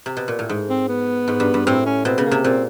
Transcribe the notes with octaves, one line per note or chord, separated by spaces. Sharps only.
C3
B2
A#2
A2
G#2
C4
B3
G#2
G2
G2
A2 C4
C#4
B2 C4
C#3 B3
A#3
C3
A#2 C4